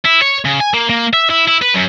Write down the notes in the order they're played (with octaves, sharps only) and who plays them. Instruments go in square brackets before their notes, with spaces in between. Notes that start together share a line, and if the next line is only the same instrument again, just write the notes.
[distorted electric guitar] E4
C#5
C#3
G#5
A#3
A#3
E5
E4
E4
B4
F#2